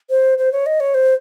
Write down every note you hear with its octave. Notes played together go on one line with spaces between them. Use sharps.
C5
C5
C#5
D#5
C#5
C5